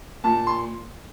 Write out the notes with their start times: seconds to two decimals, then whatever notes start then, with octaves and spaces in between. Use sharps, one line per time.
0.24 A#2 A5
0.47 C6